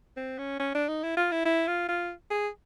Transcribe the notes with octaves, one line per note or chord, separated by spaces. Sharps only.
C4
C#4
C#4
D4
D#4
E4
F4
E4
E4
F4
F4
G#4